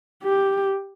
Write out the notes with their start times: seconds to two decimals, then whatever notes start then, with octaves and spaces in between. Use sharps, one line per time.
0.24 G4